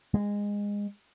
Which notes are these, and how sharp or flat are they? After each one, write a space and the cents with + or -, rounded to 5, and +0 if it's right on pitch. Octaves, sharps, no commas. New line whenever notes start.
G#3 -20